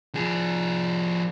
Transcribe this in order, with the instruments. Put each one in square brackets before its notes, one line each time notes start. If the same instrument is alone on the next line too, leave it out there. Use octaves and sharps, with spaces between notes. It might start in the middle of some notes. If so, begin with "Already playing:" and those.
[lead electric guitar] F3 G#4